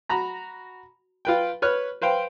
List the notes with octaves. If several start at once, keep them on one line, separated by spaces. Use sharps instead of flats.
F#4 A#5 B5
F4 B4 G5
B4 C#5 F6 F#6
B4 C5 F5 G5